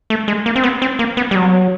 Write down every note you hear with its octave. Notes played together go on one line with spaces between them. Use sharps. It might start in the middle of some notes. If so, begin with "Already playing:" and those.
A3
G#3
A#3
C4
B3
C4
A#3
B3
G3
F#3